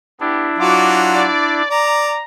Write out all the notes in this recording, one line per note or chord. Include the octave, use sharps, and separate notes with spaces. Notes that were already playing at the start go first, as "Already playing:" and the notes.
B3 D4 E4 G4
F#3 F4 F#4 D5 D6
D5
D5 A#5